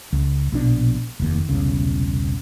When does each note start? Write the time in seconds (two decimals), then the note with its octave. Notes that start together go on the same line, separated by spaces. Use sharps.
0.13 C#2
0.52 A#1 B2 D4
1.20 F1 D#2
1.49 E1 C2 C#3